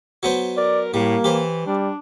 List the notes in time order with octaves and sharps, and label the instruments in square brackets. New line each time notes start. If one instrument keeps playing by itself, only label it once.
[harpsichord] F#3 B3 C5
[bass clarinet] A#4 [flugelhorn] D5
[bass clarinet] A2 [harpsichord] G3 [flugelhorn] A#3
[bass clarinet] E3 [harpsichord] G4 C5
[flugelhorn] G3 [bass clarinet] D4